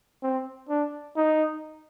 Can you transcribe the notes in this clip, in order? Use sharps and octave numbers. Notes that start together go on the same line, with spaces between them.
C4
D4
D#4